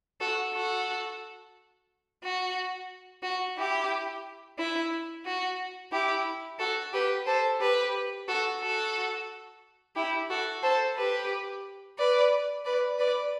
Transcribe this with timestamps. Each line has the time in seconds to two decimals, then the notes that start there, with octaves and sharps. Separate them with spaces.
0.20 F#4 A4
0.54 F#4 A4
2.22 F#4
3.22 F#4
3.56 E4 G4
4.58 E4
5.25 F#4
5.91 E4 G4
6.59 F#4 A4
6.93 G4 B4
7.26 A4 C5
7.60 G4 B4
8.27 F#4 A4
8.60 F#4 A4
9.95 E4 G4
10.29 F#4 A4
10.62 A4 C5
10.96 G4 B4
11.98 B4 D5
12.65 B4 D5
12.98 B4 D5